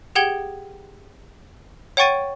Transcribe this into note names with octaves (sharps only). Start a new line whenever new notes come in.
G4 G#4 F#5 G5 G#6 G7
C#5 F#5 G5 C#6 A6 D#7